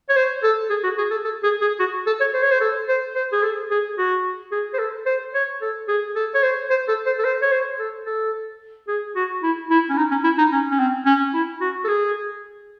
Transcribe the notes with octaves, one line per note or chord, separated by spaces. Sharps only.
C#5
C5
A4
G#4
F#4
G#4
A4
A4
G#4
G#4
F#4
A4
C#5
C5
C#5
C5
A4
C5
C5
G#4
A4
G#4
F#4
G#4
C5
A4
C5
C#5
A4
G#4
A4
C#5
C5
C5
A4
C5
A4
C5
C#5
C5
A4
A4
G#4
F#4
E4
E4
C#4
D#4
C#4
E4
D#4
C#4
C#4
C4
C#4
E4
F#4
A4
G#4